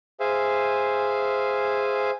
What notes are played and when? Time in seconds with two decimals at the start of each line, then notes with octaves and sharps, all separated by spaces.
0.20 G#4 C5 E5 F5 G#5